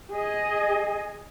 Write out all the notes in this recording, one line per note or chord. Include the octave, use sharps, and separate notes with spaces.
G#4 D#5